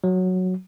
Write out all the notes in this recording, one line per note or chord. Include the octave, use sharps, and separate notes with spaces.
F#3